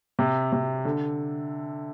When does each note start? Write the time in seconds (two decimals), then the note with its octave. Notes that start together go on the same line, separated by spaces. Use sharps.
0.19 C3
0.52 C3
0.85 D3